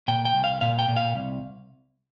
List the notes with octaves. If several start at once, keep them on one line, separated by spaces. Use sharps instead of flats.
A#2 G5
G5
C2
F5
A#2 F5
G5
A#2
F5
C2